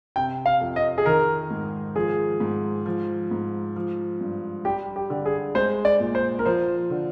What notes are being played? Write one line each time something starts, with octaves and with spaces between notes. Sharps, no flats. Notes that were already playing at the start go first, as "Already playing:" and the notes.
C3 G5
F5
F2
D#5
G#4
D#3 A#4
G#2
F3 G#4
G#2
F3
G#2
F3
G2
G3 G4
G4
D3
G#4
G#3 C5
D5
A#2
C5
A#4
F3 C5
D3